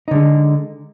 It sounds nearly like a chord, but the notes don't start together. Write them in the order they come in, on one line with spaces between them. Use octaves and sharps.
D#4 D3 G#3